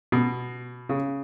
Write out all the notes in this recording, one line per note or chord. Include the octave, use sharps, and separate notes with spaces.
B2
C#3